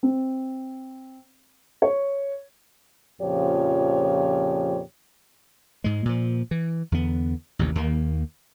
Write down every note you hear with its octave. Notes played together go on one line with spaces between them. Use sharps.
C4
C#5
F2 A#2 C#3 F3 G4 C#5
G#2 G#3
A#2 F3
E3
E2 D3 B3
A1 D#2 C3
D#2 D#3 A#3